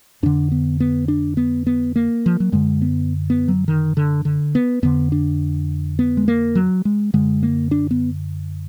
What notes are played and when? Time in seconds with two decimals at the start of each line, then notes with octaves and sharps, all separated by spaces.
0.23 F2 D3 D4
0.52 B3
0.80 B3
1.08 D4
1.37 B3
1.67 B3
1.96 A#3
2.26 F3
2.40 F#3
2.52 F#2 D3 G#3
2.82 B3
3.30 B3
3.48 F#3
3.68 D#3
3.97 D3
4.25 D3
4.55 B3
4.83 F2 D3 B3
5.12 D4
5.99 B3
6.17 G#3
6.28 A#3
6.55 F#3
6.85 G#3
7.14 F#2 D3 G#3
7.43 A#3
7.71 D4
7.91 B3